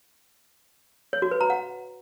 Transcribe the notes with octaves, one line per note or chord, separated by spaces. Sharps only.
C#5
F#4
B4
A#5
F#5